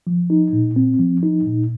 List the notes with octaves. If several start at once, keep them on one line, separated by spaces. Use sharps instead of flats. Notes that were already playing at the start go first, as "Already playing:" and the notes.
F3
D#4
A#2
C4
F3
D#4
A#2